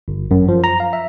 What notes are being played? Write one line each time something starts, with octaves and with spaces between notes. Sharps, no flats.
G1
F#2
F3
A#5
F5
E5